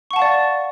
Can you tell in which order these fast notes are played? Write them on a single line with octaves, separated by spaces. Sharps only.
C#6 F#5 A5 F5 D5